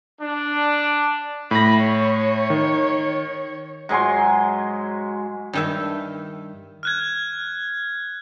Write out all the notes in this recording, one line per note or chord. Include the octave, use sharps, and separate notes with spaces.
D4
A2 B5 A#6
C#5
D#3
G#2 F#3 G#5 C6
G2 D#3 E5
F6 F#6 G#6